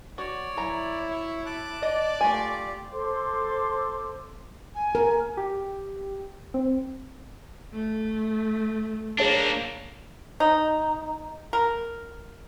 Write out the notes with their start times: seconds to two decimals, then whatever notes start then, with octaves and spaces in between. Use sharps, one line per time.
0.18 F#4 C#5 D5
0.57 F#3 E4 A#5
1.10 C#5 E5
1.46 A5 D6 F#6
1.83 D5 D#5
2.21 A3 F4 G4 G#5
2.91 A4 C5 C6 D6
4.74 G#5
4.95 A#4
5.37 G4
6.54 C4
7.73 A3
9.18 A#3 D4 G#4 C#5 A5
10.40 D#4
11.53 A#4